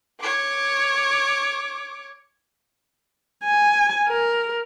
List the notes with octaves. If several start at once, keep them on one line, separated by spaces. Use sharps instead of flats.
C#5 D6
G#5
A#4